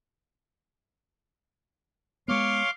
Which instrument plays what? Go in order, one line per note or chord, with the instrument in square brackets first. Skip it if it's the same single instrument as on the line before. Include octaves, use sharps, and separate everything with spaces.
[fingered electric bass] G#3 B3 [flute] C#5 [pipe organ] F5 C6 D6